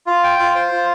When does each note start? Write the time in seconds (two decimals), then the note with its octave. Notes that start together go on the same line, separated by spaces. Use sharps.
0.07 F4
0.24 G5
0.39 F4
0.55 C5
0.72 F4